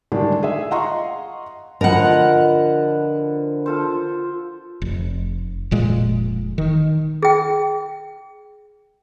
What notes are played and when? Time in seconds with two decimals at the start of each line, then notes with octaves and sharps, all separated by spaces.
0.12 A2 D3 D#3 G3 G#3 D4
0.43 G#4 E5
0.71 D#5 F5 F#5 A#5 C6 C#6
1.81 D3 F3 A#4 B4 D#5 F#5 G5 A5
3.66 F4 A4 C5
4.82 F1
5.71 F1 A#2 G#3
6.58 D#3
7.22 G#4 G5